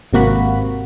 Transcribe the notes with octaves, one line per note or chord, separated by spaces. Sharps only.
G#1 C3 A#3 F#4 B5